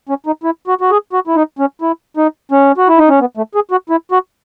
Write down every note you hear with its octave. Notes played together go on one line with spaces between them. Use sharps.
C#4
D#4
E4
F#4
F#4
G#4
F#4
E4
D#4
C#4
E4
D#4
C#4
F#4
E4
D#4
C#4
B3
A3
G#4
F#4
E4
F#4